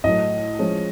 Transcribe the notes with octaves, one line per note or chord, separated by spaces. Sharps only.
A2 F#3 A3 D#5
F3 G#3 C#4 E4